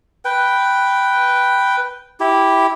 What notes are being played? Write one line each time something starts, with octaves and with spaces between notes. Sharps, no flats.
B4 G5
E4 G4